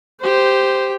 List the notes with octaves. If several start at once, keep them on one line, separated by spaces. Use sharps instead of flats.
G4 C5